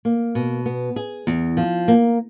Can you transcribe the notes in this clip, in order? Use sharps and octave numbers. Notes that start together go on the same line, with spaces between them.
A#3
B2
B3
G#4
E2
F3
A#3